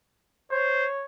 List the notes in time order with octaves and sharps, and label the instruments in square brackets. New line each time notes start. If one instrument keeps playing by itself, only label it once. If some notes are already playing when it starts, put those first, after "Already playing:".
[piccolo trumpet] C5 [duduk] C#5